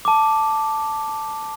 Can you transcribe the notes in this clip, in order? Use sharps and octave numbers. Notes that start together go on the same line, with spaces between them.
A5 D6